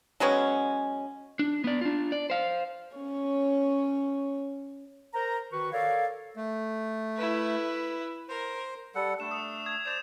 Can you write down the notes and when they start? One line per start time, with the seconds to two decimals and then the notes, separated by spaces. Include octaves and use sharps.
0.20 F#3 G#3 B3 C#4
1.39 D4
1.64 B3 D5
1.81 D4 F4
2.12 D5
2.30 C5 F5
2.95 C#4 C#5
5.14 A#4 C5 A#5
5.52 D#3 F#4 B4 C#6
5.72 A4 A#4 C#5 D5 F5
6.36 A3
7.17 E4 B4
8.29 A#4 C5
8.95 G3 A4 F#5
9.20 A3 D4 E7
9.31 D#6
9.66 D#6 G#6
9.86 C5 D5 E7 F7